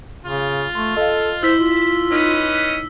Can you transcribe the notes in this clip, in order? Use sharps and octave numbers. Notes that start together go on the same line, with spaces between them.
C#3 F4
A3 C6
A4 D#5 F5
E4 C5 E6 B6 G7
F4
C#4 D#4 B4 D#5